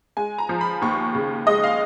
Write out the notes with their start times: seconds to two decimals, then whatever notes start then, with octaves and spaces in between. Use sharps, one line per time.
0.17 G#3 G#5
0.38 A#5
0.49 F3
0.61 B5
0.82 D#2 C#6
1.15 C#3
1.46 G#3 D#5
1.64 F5